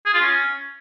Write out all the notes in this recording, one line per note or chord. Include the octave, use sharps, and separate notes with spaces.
G#4
F4
C#4